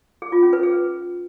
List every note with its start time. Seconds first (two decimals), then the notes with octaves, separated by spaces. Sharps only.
0.22 G#4
0.32 F4
0.43 C#4
0.53 B4
0.63 G#4